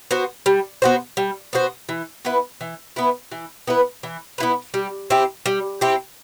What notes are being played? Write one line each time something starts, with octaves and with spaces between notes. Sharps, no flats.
B3 F#4 C5
G3
B3 F#4 C5
G3
B3 F#4 C5
E3
B3 E4 B4
E3
B3 E4 B4
E3
B3 E4 B4
E3
B3 E4 B4
G3
C4 E4 G4
G3
C4 E4 G4